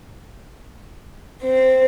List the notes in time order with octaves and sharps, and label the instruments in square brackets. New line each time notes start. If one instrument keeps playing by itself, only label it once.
[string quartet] C4